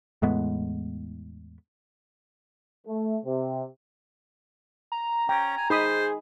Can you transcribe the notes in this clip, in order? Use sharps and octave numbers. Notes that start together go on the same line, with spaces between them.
E2 A2 G#3 B3
A3
C3
A#5
C#4 G5 A#5
G#5
D#4 G#4 C5 B5 D#6